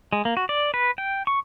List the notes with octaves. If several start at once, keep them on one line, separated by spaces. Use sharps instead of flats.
G#3
A#3
F#4
D5
B4
G5
C#6